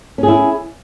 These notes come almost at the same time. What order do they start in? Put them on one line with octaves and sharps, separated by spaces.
C#4 G#4 E4